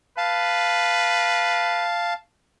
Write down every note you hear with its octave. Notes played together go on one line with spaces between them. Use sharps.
B4 F5 A5